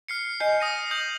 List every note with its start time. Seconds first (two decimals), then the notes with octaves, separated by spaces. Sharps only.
0.08 F6 C7 C#7
0.40 D#5 G#5 G6 C7
0.60 D#6 A#6 D#7
0.91 D#6 G6 F#7